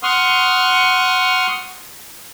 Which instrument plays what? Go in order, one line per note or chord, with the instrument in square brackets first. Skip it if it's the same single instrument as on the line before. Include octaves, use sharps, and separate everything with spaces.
[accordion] F#5 C6 C#6 D#6 F6